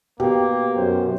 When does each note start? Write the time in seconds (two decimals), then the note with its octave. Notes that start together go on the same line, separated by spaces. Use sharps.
0.20 B2 A#3 G4
0.77 F#2 C5